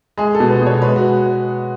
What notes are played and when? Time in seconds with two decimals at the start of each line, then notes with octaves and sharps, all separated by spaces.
0.18 G#3 G#4
0.35 A4
0.40 B2
0.50 B4
0.61 B2
0.66 C#5
0.82 G#3 B4
0.96 F#4